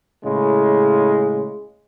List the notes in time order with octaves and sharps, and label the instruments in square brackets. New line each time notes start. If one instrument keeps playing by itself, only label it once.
[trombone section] A2 C#3 G#3